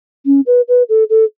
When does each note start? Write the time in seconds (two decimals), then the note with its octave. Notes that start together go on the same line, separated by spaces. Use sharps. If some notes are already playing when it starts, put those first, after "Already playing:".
0.26 C#4
0.46 B4
0.68 B4
0.89 A4
1.10 A4